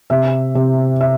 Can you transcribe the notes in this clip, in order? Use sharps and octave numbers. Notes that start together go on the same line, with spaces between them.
C3 E5
C3
E5